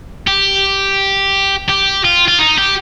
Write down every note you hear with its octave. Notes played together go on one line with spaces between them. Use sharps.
G4
G4
F4
F4
D#4
G4